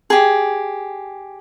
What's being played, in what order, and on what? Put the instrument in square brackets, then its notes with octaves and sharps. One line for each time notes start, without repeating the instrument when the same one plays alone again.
[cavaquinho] G4 G#4